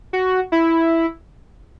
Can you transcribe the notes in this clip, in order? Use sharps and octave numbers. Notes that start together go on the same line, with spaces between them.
F#4
E4